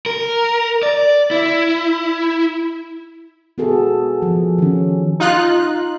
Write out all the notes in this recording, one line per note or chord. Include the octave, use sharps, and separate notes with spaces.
A#4
D5
E4
B3 F#4 G#4 A4
F3
D#3 C#4
D#4 F4 F#6